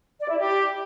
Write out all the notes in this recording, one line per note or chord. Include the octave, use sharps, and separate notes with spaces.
D5
E4
G4